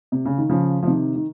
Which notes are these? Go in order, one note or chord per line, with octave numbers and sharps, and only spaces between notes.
C3
C#3
D#3
C#3 F3
F3
C3 D#3
D#3